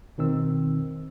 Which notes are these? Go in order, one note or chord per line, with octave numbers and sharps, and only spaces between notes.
B2 D#3 C4 E6